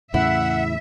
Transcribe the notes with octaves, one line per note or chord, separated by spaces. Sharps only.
E2 A2 C#3 E4 E5 F#5